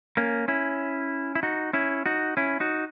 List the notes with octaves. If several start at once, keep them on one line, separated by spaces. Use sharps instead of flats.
A#3 C#4
C#4 E4
E4
D#4 F#4
C#4 E4
D#4 F#4
C#4 E4
D#4 F#4